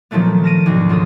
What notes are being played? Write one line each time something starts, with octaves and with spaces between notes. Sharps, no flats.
A#2 D#3 F3 F#3 A3 B3
A5 F6 A#6 D7 D#7
D2 G#2 B2 D#3
C#2 F4 A4 D#6